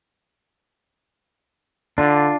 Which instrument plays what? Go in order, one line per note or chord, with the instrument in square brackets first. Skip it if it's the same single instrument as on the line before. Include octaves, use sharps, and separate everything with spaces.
[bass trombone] D3 [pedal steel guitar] D4 F4